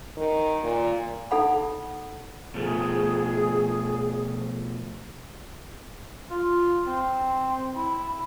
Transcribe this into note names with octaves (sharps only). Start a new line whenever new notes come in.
D#3
A#2
D#4 A4 F#5 B5
B2 F3 A3 G#4
F4
C4
E4